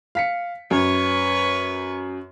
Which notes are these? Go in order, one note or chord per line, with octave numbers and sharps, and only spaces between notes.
F5 B6 C#7
F#2 B4 C#5